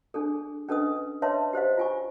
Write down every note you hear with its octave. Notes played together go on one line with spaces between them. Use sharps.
D4 G#4 A4
C#4 D4 A4 B4 D#5 D#6
B4 C#5 D#5 E5 A5 C6
G4 C5 D#5 F5
F4 G#5 C#6